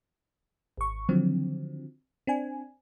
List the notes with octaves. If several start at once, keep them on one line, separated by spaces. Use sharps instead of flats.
G#1 C#6
D3 D#3 F3 F#3 C4
C4 D4 G#5